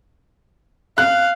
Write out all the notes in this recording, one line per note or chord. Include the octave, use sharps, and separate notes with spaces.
F5 F#6